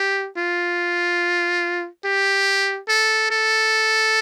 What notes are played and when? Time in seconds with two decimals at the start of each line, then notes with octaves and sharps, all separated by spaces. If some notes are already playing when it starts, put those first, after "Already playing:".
Already playing: G4
0.37 F4
2.04 G4
2.88 A4
3.30 A4